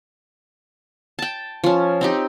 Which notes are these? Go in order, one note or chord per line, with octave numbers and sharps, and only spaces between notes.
G5 A5
F3 C#4
C4 D#4 G4